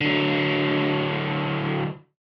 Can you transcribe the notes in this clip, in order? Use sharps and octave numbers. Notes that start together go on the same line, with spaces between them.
D3 F#3